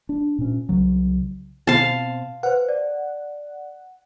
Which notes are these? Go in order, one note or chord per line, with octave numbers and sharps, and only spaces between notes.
D4
A#2 C#4
C2 C#3 F#3
B2 C4 C5 F5 A5
B4 C5 F#5
D5